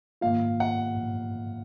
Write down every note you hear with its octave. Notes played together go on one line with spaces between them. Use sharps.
G#2 D#3 A#3 F4 F5
F#5